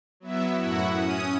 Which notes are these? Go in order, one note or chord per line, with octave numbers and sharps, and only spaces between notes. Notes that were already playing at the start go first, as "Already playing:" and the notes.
F#3 B3 E4 E5
F#2 A2 E4 F#4 F#5
C#4 D#6